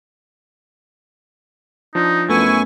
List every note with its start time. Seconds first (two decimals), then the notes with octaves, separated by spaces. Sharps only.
1.95 F3 D4 D#4 F4
2.29 F#2 A3 B3 E4 G#5 C#6